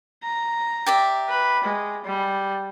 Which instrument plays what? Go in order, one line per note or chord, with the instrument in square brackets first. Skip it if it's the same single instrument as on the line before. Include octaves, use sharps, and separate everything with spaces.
[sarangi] A#5
[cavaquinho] G4 D5 E5
[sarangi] B4
G#3
G3